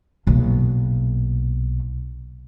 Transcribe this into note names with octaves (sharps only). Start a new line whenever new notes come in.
B1 A#2